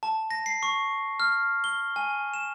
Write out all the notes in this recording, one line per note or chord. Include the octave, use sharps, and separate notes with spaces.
A5
A#6
C7
C#6
F6
G7
G#5
E7